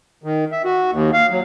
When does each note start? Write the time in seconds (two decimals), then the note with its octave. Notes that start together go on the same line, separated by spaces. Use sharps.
0.24 D#3
0.52 E5
0.65 F#4
0.91 D#2
1.13 F5
1.30 F#3